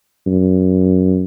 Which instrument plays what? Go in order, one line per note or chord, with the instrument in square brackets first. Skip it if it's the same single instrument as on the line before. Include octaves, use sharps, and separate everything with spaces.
[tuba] F#2